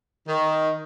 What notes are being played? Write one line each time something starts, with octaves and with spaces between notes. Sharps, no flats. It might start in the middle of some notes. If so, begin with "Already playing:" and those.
D#3